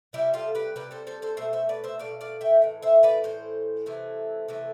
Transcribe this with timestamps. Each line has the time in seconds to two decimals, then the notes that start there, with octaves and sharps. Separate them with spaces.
0.13 C3 G3 E4 G4
0.34 F4 A4
0.55 G4 B4
0.76 C3 G3 G4 B4
0.91 A4 C5
1.07 A4 C5
1.22 A4 C5
1.37 B2 A3 C5 E5
1.53 C5 E5
1.69 B4 D5
1.84 C5 E5
1.99 B2 A3 D5 F5
2.21 D5 F5
2.41 E5 G5
2.62 A2 E3
2.82 C5 E5
3.03 B4 D5
3.24 A2 E3 C5
3.86 C3 E3 A3
4.48 C3 E3 A3